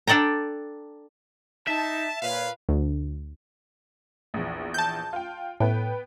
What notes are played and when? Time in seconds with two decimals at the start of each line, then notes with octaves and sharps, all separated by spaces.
0.07 D4 A4 D5 G5 A#5
1.67 D#4 E5 A5
2.22 A#2 B4 C#5 F5
2.69 D2
4.34 A#1 E2
4.74 A5 G6
5.13 F4 G5
5.60 A2 B3 B4 G5